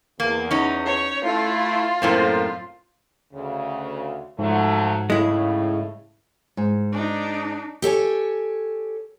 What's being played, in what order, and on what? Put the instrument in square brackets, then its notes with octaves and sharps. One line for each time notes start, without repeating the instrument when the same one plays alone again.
[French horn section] E2 [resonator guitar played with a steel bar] A#3
[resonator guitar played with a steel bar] C#4 D#4
[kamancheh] C#5
[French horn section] A3 E4 [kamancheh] F4
[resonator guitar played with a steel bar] F#2 A2 C4 [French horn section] A#3 A4 C5
[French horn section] D2 C#3
[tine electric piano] G#2 [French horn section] F3 F#3 A3
[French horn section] A2 C#3 [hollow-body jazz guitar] G#3 E4
[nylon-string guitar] G#2
[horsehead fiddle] D4 D#4
[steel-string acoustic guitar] G4 A4 C#5 G#5